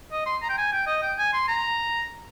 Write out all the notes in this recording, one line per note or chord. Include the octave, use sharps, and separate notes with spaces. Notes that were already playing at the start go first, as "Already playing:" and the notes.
D#5
C6
A#5
G5
G#5
G5
D#5
G5
G#5
C6
A#5